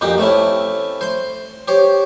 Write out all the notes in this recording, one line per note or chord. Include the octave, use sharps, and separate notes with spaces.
F2 A#2 D#4 G4
A3 C4 C#4 E4
C5 C6
G4 C5 C#5